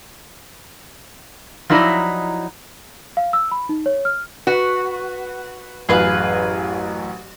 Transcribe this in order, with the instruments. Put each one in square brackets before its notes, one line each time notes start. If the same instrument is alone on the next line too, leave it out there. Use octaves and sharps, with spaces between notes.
[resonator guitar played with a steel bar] F3 F#3 D#4 E4 D5 D#5
[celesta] F5
E6
B5
D#4
C#5
F6
[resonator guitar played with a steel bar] F#4 [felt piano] B4
[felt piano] A1 F#2 [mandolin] G#4 B4 F5